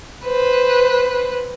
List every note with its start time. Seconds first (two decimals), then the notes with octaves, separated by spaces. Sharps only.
0.24 B4 C5